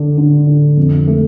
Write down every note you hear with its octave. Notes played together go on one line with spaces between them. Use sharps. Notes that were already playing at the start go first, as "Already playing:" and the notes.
Already playing: D3 D4
D3
D3
F2
A3